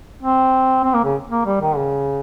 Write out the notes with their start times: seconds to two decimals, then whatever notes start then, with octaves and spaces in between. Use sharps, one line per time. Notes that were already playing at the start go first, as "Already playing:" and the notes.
0.23 C4
0.84 C4
0.94 A#3
1.04 C#3
1.30 A#3
1.46 G3
1.61 D#3
1.76 C#3